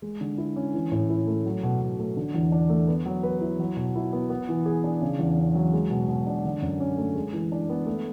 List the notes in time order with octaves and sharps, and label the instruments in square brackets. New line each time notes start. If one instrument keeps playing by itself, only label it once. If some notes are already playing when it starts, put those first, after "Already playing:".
[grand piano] G#3
D3
E4
C#4
E3
A2
E4
A3
F#3
B2
B2
A3
D3
E2
D4
A3
B3
F#3
B4
E4
F#3
B2
E4
B3
B3
E3
G#4
D4
C#3
E2
C#4
F#3
G#3
B2
B2
D4
D3
F#2
C#4
A3
G#3
E3
D4
B3
A3